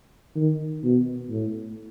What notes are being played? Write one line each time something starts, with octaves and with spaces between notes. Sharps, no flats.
D#3
B2
A2